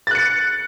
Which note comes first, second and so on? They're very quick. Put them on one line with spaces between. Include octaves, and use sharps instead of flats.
A6 F#6 C#7